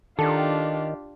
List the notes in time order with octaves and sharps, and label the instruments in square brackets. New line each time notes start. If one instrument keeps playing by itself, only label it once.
[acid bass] D#3 [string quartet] D4 F4 G4 [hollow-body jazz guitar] A4